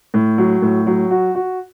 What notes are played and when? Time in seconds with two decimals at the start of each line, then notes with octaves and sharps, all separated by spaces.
0.14 A2
0.38 F#3
0.62 A2
0.87 F#3
1.11 F#4
1.35 F#4